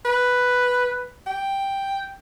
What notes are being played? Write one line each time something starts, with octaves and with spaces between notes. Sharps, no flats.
B4
G5